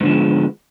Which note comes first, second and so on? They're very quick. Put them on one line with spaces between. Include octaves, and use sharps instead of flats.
G#2 D3 F3 B3 G#3